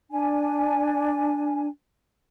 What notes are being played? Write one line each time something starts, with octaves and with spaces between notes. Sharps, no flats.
D4 G#5